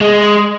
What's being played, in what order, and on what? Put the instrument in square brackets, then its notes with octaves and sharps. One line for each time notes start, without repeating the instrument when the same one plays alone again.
[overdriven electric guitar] G#3